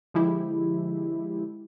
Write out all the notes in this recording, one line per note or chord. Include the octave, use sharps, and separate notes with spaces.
D3 F3 G#3 E4 G4